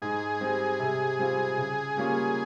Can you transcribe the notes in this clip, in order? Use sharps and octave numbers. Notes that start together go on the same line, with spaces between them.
G#2 G#4
G3 C4
C3
G3 C4 F4
C#3
G3 A#3 C#4 F4